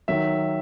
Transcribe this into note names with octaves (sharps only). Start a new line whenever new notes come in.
D#3 F#3 E5